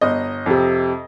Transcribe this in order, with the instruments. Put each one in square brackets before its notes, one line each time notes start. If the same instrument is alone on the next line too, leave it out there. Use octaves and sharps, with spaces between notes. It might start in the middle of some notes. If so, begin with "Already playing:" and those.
[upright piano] G1 D#5
F2 C3